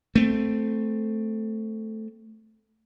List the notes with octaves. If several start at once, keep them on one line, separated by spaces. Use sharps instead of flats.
A3 C4